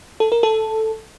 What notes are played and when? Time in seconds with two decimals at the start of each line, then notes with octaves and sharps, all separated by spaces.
0.20 A4
0.32 A#4
0.43 A4